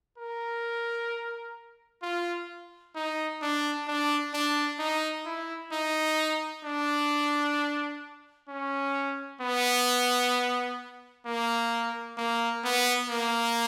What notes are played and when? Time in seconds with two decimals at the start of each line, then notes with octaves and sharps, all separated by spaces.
0.18 A#4
2.03 F4
2.95 D#4
3.42 D4
3.87 D4
4.34 D4
4.79 D#4
5.25 E4
5.72 D#4
6.65 D4
8.48 C#4
9.41 B3
11.26 A#3
12.18 A#3
12.64 B3
13.10 A#3